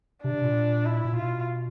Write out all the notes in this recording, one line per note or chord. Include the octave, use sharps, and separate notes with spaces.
C3 D4
C3
A#2
E4
A#2
B2 F4